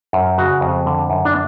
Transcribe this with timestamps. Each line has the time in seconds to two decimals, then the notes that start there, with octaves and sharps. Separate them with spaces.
0.13 F#2
0.38 C#3 F#4
0.61 F2
0.86 D3
1.10 F#2
1.25 D4